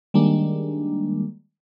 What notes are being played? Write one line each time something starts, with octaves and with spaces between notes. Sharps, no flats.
D#3 G3 G#3 A#3 D4